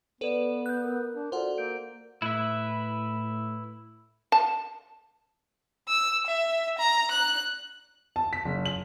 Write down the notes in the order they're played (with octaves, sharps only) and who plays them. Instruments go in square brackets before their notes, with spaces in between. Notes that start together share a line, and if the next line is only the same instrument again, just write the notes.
[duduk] B3 [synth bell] A4 B4 [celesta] D5 D#7
[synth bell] F#6 G6
[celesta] A#4
[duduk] D4
[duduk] F4 [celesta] F#4 A4 D5 [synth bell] C5 F#5
[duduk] A#3 [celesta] A#4 G6 D7
[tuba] A2 [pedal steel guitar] E4 B4 E5
[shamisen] A5
[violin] E6
E5
A#5
F#6
[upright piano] A5
B6
F#1
F#7